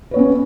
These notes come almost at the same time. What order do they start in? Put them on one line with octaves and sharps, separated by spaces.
B4 C#5 B3 C#4